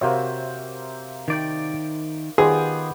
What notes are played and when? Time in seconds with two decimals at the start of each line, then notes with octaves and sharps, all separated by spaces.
0.01 C3 A#3 F#4 C5 C#5 E5
1.28 D#3 D5 G5
2.38 D#3 B3 F4 G4 G#4 C5